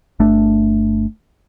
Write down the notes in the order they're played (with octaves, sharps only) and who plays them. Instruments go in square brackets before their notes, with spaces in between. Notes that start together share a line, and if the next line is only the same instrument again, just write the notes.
[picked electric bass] G1 A3 D4